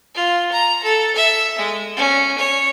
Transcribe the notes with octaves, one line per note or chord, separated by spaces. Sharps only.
F4
A#5
A4
E5
G#3
C#4
C#5